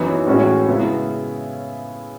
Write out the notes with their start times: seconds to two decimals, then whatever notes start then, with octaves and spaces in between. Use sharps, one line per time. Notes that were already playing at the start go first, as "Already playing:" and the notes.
Already playing: F#2 E3 B3 D#4
0.26 A2 G#3 C#4 F#4
0.68 C#3 G#3 B3 E4